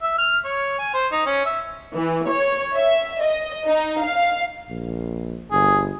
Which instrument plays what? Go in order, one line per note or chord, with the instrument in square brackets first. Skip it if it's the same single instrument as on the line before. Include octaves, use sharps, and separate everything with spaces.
[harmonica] E5
F6
C#5
G#5
C5
D#4
C#4
E5
[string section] E3
C#5
E5
D#5
D#4
F5
[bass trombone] A#1
[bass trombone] G1 [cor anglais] G#4